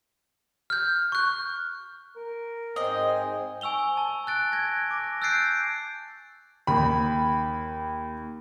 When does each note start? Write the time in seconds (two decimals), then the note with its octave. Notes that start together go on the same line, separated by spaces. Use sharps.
0.70 F6 G6
1.12 C#6 F#6
2.16 A#4
2.76 G#2 C4 C5 D#5 G#5
3.61 G#5 C#6 E6 F7 G7
3.97 A5
4.27 F#6 A6 D7
4.52 G#6 A#6
4.91 D6 A#6
5.22 E6 F#6 G6 A6 C7 D7
6.67 D#2 B5